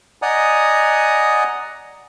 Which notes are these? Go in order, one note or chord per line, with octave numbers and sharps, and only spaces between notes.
D5 D#5 F#5 G#5 A#5 D#6